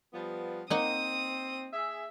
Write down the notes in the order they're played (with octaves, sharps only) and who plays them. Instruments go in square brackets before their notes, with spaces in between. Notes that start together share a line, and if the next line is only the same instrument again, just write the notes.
[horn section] F3 G3 B3
[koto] A#3 D#4 F#5 [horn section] C4 [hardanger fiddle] D#6
[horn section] G#4 E5